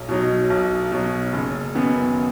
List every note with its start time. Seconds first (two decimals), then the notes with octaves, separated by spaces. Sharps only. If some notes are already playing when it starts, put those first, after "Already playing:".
Already playing: B1
0.09 B2 F#3 D#4
0.50 B1
0.92 B2 F#3 D#4
1.33 F#1
1.75 F#2 D#3 B3